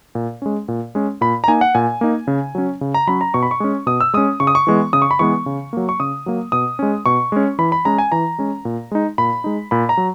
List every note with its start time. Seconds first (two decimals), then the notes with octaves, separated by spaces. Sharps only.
0.15 A#2
0.42 G#3 C#4
0.68 A#2
0.95 G#3 C#4
1.21 A#2 B5
1.44 A#5
1.48 A#3 D#4 G#5
1.61 F#5
1.75 A#2 G#5
2.01 A#3 D#4
2.27 C#3
2.55 F#3 C#4
2.81 C#3
2.94 A#5
3.07 F#3 C#4 B5
3.21 A#5
3.34 B2 C#6
3.43 B5
3.51 C#6
3.60 G#3 C#4
3.86 B2 D#6
4.01 E6
4.14 G#3 C#4 D#6
4.40 C#3 C#6
4.47 D#6
4.55 C#6
4.67 E3 G#3 B3
4.93 C#3 D#6
5.02 C#6
5.11 B5
5.19 E3 G#3 B3 C#6
5.46 C#3
5.73 F#3 A#3
5.89 C#6
6.00 C#3 D#6
6.26 F#3 A#3
6.52 B2 D#6
6.79 G#3 C#4
7.06 B2 C#6
7.32 G#3 C#4
7.59 E3 B5
7.72 B5
7.85 G#3 C#4 A#5
7.98 G#5
8.12 E3 A#5
8.38 G#3 C#4
8.65 A#2
8.92 G#3 D#4
9.18 A#2 B5
9.44 G#3 D#4
9.71 A#2 B5
9.89 A#5
9.97 F#3